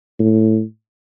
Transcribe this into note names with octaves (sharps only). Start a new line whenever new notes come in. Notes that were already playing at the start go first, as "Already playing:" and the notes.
A2